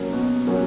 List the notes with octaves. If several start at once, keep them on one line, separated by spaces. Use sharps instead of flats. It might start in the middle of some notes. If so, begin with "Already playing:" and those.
Already playing: B2 F#3 A#3 C#4
B2
F#3 A#3 C#4